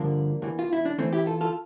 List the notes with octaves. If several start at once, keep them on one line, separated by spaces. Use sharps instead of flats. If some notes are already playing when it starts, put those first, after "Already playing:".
Already playing: G2 D3 F3 A#3 D4
E2 E3
F4
E4
D4
E2 E3 A3 C4
E4 G4
F4 A4
F4 A4